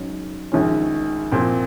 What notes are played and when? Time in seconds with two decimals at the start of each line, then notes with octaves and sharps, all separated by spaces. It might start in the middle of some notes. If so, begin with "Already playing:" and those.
Already playing: G#2 F#3 C#4
0.52 A#1 G#2 D#3 G#3 C#4
1.31 A#2 F3 C4